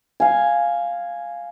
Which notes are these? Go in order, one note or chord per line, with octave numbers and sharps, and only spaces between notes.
F5 G#5